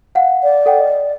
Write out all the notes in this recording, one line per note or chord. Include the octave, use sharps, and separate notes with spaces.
F5 F#5
D5
A4 F#5 G5
D#5